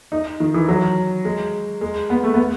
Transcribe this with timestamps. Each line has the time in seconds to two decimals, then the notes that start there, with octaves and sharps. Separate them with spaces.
0.12 D#4
0.40 D#3
0.54 E3
0.68 F#3
1.25 G#3
1.81 G#3
2.10 B3
2.24 A3
2.34 B3